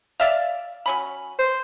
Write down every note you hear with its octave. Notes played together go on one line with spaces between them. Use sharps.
D5 E5 F5
F#3 C#4 B5
C5